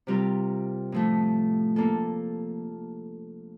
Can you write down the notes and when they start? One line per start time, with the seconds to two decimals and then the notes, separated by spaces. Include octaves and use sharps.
0.07 C3 G3 C4 F4 A#4
0.92 A2 F3 A3
1.76 A#3 D4 F4 A4